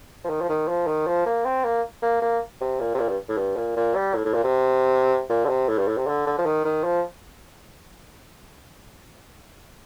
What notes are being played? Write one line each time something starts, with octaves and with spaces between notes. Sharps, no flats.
F3
D#3
F3
D#3
F3
D#3
F3
A#3
C4
A#3
A#3
A#3
C3
A#2
C3
A#2
G2
A2
G2
A#2
A#2
G3
A2
A2
A#2
C3
A#2
D3
C3
A2
G2
A2
C3
D3
D3
F3
D#3
D#3
F3